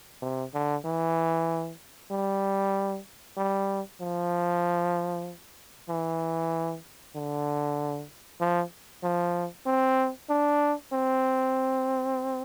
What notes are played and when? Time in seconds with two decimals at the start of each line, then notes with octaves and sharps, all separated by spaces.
0.22 C3
0.54 D3
0.85 E3
2.11 G3
3.37 G3
4.01 F3
5.89 E3
7.15 D3
8.41 F3
9.03 F3
9.66 C4
10.30 D4
10.93 C4